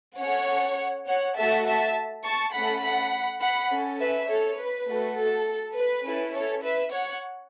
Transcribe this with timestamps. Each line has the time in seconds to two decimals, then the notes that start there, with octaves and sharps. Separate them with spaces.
0.20 C#4 A4 C#5 F#5
1.08 C#5 F#5
1.37 A3 F#4 A4 E5 A5
1.66 E5 A5
2.24 A5 C#6
2.54 A3 C#4 A4 F#5 B5
2.83 F#5 B5
3.41 F#5 B5
3.71 C#4 A4
4.00 B4 E5
4.29 A4 C#5
4.58 B4
4.88 A3 F#4 A4
5.17 A4
5.75 B4
6.05 C#4 E4 A4
6.34 A4 C#5
6.63 B4 E5
6.92 C#5 F#5